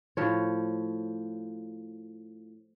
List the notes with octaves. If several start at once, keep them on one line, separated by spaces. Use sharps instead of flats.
A2 F3 C#5